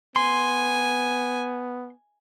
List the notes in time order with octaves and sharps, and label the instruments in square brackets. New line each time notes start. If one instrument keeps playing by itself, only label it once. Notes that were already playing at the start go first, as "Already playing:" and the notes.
[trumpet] B3 [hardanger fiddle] G#5 [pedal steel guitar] C6